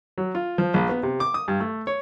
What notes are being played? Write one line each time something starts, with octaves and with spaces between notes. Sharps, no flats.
F#3
F4
F3
A#1
B3
C3
D6
D#6
G2
A3
C#5